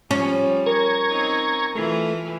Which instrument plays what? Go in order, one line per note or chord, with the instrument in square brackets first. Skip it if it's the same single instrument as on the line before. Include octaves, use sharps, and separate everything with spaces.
[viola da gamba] F3 G3 [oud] C#4
[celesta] A#4 [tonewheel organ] A#5 C#6 G#6
[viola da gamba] C4 D#4
[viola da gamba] E3 E4 F4 [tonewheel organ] A3